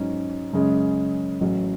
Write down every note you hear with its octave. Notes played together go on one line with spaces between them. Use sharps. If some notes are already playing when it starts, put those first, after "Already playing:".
Already playing: G#2 F#3 C#4
F#2 C#3 G#3 C#4
A1 A2 F#3 C#4